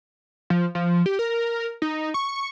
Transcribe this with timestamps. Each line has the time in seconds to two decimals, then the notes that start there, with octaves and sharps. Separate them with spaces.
0.50 F3
0.75 F3
1.06 G4
1.19 A#4
1.82 D#4
2.14 C#6